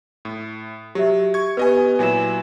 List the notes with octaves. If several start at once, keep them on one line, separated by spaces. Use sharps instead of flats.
A2
F#3 G4 E5
C#6 G#6
B3 G4 B4 D#5 G#5
A#2 F#3 E4 G#5 E7